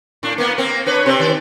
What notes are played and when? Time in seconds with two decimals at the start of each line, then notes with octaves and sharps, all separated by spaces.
0.23 A2 D4
0.38 A#3 B3
0.58 A#3 C4
0.86 D4 B4 C#5
1.06 C3 C4
1.20 D#3 D5